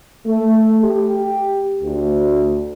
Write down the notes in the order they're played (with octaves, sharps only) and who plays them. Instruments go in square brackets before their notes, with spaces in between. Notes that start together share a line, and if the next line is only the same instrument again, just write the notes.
[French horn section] A3
G4
D2